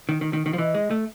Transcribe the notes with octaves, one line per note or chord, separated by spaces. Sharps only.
D#3
D#3
D#3
D#3
F3
E3 D#5
G#3
A3